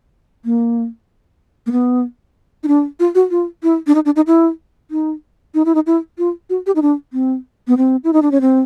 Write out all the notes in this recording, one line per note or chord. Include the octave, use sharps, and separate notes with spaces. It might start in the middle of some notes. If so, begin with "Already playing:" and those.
A#3
A#3
B3
D#4
D4
F4
F#4
F4
E4
D4
D#4
D4
D#4
E4
D#4
D#4
E4
D#4
E4
F4
F#4
G4
D#4
D4
C4
B3
C4
E4
D#4
D4
C#4
C4